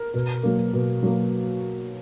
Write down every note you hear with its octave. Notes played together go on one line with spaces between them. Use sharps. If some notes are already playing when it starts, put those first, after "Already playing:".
Already playing: A#4
B2
F#3 A#3
B2
F#3 A#3